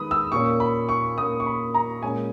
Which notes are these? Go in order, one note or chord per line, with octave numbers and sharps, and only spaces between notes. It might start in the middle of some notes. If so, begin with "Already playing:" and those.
Already playing: D#3 G#3 B3 B5 D#6
E6
A#2 A#3 C#4 C#6
B5
C#6
A#2 A#3 C#4 D#6
C#6
B5
A#5
A#2 G#3 C#4 G#5